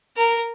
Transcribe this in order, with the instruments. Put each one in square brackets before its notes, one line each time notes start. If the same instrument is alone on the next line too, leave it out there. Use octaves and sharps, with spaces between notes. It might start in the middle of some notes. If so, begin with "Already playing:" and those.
[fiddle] A#4